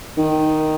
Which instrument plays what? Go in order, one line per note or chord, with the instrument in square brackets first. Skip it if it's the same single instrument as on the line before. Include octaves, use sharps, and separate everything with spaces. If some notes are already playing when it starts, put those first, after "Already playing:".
[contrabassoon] D#3